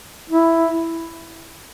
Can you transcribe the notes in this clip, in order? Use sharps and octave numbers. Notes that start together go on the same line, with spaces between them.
E4